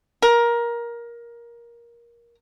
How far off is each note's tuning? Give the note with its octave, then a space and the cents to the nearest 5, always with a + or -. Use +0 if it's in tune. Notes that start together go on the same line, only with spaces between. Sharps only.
A#4 +15